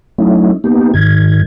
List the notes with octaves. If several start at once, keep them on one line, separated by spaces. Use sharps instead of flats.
F#3 A3 C#4 D#4 E4
A#3 B3 D#4 G4
G#2 D#3 G#6